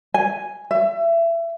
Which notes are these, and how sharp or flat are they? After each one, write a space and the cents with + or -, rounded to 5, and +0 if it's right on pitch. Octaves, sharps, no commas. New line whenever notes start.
G#5 +0
E5 +25